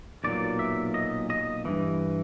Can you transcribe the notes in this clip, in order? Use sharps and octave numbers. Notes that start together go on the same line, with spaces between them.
B1 A#2 F#3 D5
E5
D#5
D#5
G2 E3